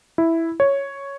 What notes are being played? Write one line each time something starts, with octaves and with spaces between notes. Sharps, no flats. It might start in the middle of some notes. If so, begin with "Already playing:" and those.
E4
C#5